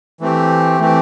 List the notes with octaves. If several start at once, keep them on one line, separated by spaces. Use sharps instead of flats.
E3 A3 C4 G4
E3 A3 C4 G4